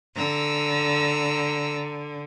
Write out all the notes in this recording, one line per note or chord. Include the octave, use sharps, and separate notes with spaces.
D3 A#5 E6